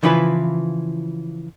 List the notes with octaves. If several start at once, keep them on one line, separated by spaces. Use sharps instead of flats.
C#3 E3 F3 E4 F4 B4